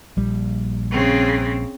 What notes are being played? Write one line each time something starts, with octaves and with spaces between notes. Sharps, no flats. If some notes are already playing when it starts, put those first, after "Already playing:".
A#1 G3
C#3 C4